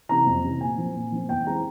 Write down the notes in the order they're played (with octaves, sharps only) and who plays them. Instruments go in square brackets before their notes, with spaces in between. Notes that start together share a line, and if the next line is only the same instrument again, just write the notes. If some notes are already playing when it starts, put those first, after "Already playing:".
[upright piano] C3 E3 A#5
F2
C3 E3
A#2 G#5
F3 C4
A#2
F3 C4
E2 G5
E3 G#3 C4 A#5